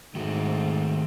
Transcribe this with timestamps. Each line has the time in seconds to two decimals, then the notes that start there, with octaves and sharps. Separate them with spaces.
0.15 G#2 D#3 A3 C4 F#4 A4